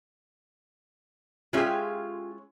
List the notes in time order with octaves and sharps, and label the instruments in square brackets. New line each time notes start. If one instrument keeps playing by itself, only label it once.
[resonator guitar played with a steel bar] G#3 C#4 E5 [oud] F4 G4 G#4